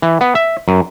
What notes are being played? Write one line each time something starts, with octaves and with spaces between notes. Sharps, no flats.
E3
B3
E5
F#2